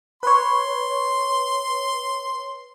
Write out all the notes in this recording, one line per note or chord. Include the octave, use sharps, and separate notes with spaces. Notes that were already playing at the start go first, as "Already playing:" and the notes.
B4 C#5 C6